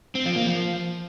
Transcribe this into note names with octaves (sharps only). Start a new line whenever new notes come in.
C4
F3
A#3
F3